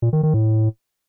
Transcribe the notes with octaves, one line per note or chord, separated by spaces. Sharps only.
A#2
D#3
D#3
A2